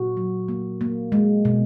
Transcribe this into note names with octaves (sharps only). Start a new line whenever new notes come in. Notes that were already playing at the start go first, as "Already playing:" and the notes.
Already playing: A#2 F#4
F#3
A#3
A#3
G#3
B2